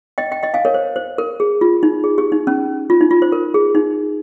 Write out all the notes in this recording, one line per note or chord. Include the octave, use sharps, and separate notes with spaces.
D#5 G5
D#5 G5
D#5 G5
F5 G#5
A#4 C#5
C5
C5
A#4
G#4
F4
D#4
G#4
G4
D#4
C#4
F4
D#4
F4
C5
A#4
G#4
D#4